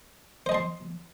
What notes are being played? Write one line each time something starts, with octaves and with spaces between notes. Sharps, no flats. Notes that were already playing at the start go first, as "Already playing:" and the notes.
C5 D#5 A5 C6